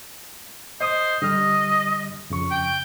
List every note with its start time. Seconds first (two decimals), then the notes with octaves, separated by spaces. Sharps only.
0.81 C5 D#5 D#6
1.22 D3 G3 D#5 F6
2.30 F2 C#3 C#6
2.51 G5